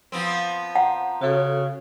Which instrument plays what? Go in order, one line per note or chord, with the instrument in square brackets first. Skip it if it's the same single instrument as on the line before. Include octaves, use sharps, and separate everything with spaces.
[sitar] F3 B3 C4
[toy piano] F#5 [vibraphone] A#5
[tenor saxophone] C#3 [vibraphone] F#4 A4